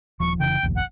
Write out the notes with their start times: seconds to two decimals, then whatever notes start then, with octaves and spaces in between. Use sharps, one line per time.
0.20 D#1 F3 C#6
0.40 F1 C#3 E3 G5
0.63 F1 A#1 D#2
0.76 F#5